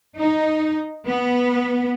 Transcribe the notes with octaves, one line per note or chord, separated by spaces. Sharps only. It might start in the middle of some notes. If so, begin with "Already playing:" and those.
D#4
B3